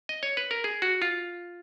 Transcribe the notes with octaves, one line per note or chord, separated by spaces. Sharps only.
D#5
C#5
B4
A#4
G#4
F#4
F4